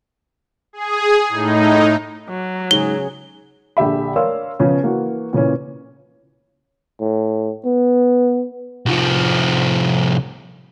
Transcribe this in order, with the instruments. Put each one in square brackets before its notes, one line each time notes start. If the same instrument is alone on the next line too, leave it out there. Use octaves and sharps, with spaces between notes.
[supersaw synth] G#4
A2 D#4
[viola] F#3
[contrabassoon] G#2 [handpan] C#3 G#4 C#5 [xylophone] G7
[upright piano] A#1 D3 G4 E5 B5
A#4 C#5 D5 F5 C6 E6
C#3 F3 B3 C#4
E3 A#3 F#4
A#2 C#3 E3 C#4
[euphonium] A2
B3
[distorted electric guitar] C2 F3